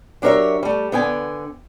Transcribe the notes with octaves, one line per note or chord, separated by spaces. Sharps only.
F#3 D4 G4 A#4 C#5 E5
G3 A3
D3 B3 G5 G#5